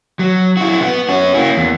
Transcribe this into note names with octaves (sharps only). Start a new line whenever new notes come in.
F#3
E4 F#4
B3
C#4 F#4
A#3 E4
E2